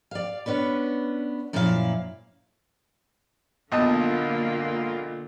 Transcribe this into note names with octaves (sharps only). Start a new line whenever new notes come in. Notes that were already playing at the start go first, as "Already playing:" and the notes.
D5 F5
B3 C#4 D4 B4
F#2 A#2 F3 E4 A4 F5
B1 D3 A#3 F4 D#5 A5